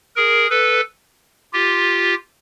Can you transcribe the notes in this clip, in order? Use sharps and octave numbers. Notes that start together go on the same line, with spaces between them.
G#4 A#4
A4 B4
F4 G4